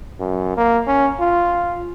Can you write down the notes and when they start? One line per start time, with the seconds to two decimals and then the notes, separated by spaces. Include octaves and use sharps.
0.20 F#2
0.57 A#3
0.87 C#4
1.20 F4